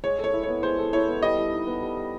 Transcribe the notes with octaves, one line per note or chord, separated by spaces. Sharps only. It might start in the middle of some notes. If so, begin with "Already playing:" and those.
G#3 C#5
A4
C#5
E4
B3 C#5
G#3 C5
A4
E4 C#5
B3
G3 D#5
G3
D#4
B3
G3
G3